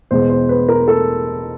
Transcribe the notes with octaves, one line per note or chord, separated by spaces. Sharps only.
E2 B2 G#3 C5
C5
B4
A#4
A4